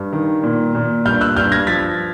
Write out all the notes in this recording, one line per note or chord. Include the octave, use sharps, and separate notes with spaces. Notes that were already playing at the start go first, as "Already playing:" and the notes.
Already playing: G2
D#3
A#2
A#2
G2 F6 G6
E6 F#6
G2 F6 G6
G#6 A#6
F3 A6 B6